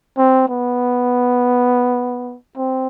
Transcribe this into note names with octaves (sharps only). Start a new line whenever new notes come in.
C4
B3
C4